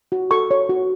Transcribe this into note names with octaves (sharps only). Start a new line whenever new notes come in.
F#4
A4 C#6
C#5
F#4